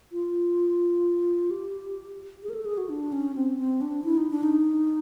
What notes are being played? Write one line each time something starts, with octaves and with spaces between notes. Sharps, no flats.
F4
G4
G#4
A#4
A4
G#4
F#4
D4
C#4
C4
C4
D4
E4
D#4
D4
D#4